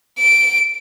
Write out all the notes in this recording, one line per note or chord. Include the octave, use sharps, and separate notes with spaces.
D7